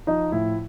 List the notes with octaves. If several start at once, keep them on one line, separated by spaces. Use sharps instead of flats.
F3 D#4
A2 E4